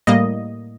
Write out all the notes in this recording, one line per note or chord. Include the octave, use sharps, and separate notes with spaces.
A2 G3 A#3 D#5